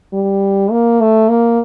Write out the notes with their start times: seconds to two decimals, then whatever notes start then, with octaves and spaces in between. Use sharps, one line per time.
0.13 G3
0.71 A#3
1.01 A3
1.29 A#3